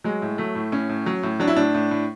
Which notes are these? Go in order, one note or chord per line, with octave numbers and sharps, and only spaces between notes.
F#3 G#3
A2
F#3 A3
A2
A2 C#4
A2
F#3
A2
F#3 D4
E4
A2 D4
A2
A2